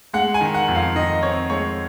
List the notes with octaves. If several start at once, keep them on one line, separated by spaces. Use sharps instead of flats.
G#3 F#5
G#5
D#3
F#5
F2
F5
D#3 D#5
C4 C#5
G#3 C#5